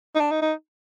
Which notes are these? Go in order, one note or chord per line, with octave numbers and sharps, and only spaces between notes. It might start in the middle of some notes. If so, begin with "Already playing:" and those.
D#4
D4
D#4
D#4